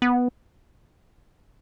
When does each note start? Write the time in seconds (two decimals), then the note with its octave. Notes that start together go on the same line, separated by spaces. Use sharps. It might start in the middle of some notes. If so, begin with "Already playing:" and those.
0.02 B3